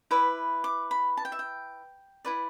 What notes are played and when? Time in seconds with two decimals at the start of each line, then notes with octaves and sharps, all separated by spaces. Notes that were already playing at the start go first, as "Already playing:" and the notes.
0.11 E4 B4 D5 B5
0.64 D6
0.91 B5
1.17 A5
1.25 G5
1.32 E5
1.39 G5
2.25 E4 B4 D5